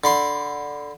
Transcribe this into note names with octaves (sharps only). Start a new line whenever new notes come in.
D3 B5 C6